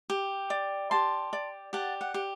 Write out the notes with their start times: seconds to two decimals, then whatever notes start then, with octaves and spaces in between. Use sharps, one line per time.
0.10 G4
0.50 D5
0.91 G4 A5 C6
1.33 D5
1.73 G4 F#5 A5
2.01 F#5
2.14 G4